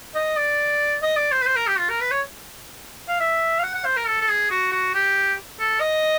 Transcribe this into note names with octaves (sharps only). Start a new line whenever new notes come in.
D#5
D5
D#5
D5
C5
B4
C5
A#4
G4
F4
A#4
B4
C#5
F5
E5
F5
F#5
F#5
C5
A#4
A4
A4
G#4
F#4
F#4
G4
A4
D#5